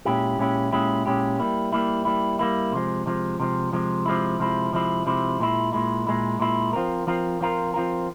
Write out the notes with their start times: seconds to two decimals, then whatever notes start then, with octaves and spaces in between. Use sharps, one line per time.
0.05 A#2 G#3 C#4 E4 G4
0.39 A#2 G#3 C#4 E4 G4
0.71 A#2 G#3 C#4 E4 G4
1.06 A#2 G#3 C#4 E4 G4
1.39 G3 A#3 E4
1.73 G3 A#3 E4
2.05 G3 A#3 E4
2.39 G3 A#3 E4
2.73 C3 F3 G#3
3.06 C3 F3 G#3
3.40 C3 F3 G#3
3.73 C3 F3 G#3
4.06 C3 F3 G#3 E4
4.40 C3 F3 G#3 E4
4.73 C3 F3 G#3 E4
5.06 C3 F3 G#3 E4
5.40 A#2 G#3 E4
5.73 A#2 G#3 E4
6.07 A#2 G#3 E4
6.40 A#2 G#3 E4
6.73 F3 C4 F4 A#4
7.07 F3 C4 F4 A#4
7.41 F3 C4 F4 A#4
7.74 F3 C4 F4 A#4